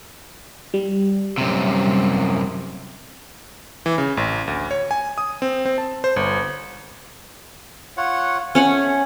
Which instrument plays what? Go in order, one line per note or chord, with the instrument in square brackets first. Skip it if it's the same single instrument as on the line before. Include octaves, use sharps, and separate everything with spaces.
[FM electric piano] G3
[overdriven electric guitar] F#2 C3
[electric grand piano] E3
C#3
A1
D2
C#5
G#5
D#6
C4
C4
A5
C5
G1
[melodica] F4 C#5 F#5
[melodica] A3 [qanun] C#4 C#5 F#5